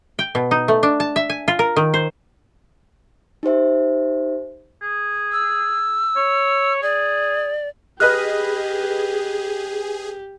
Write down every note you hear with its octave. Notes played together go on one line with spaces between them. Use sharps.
G5
B2
D#4
A3
D4
A5
E5
G#5
F4
A#4
D#3
C5
D#4 G4 C5 E5
G#4
E6
C#5
G#4 D5
G4 G#4 B4 D#5 F6 F#6